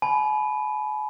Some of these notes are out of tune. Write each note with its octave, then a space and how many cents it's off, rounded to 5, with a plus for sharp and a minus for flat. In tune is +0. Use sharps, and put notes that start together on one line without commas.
G#5 +45 B5 +0